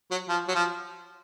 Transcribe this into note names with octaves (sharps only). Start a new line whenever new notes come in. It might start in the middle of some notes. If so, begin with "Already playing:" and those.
F#3
F3
F#3
F3